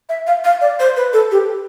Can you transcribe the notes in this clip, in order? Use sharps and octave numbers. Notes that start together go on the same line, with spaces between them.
E5
F5
F5
D5
C5
B4
A4
G4